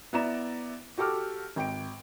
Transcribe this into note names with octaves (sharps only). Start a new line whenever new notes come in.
B3 E4 D5 A#5 E7
F#4 G4 A4 D6 F6
G#1 G5 D7